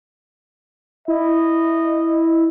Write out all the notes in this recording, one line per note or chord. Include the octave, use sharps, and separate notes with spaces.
E4 D#5